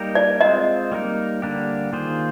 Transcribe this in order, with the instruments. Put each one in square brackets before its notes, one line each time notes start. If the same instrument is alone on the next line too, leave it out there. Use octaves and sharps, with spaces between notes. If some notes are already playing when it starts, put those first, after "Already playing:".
Already playing: [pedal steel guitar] G3 A#3 D#4 G4 A#4
[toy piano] D5
[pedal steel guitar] G#3 C4 F4 C5 [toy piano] D#5
[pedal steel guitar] G3 A#3 D#4 A#4
D3 G3 A#3 D4 G4
D#3 A#3 F4 G#4 C5